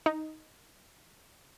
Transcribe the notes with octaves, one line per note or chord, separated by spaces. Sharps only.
D#4